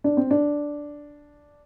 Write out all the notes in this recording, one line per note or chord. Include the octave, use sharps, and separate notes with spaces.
D4
C4
D4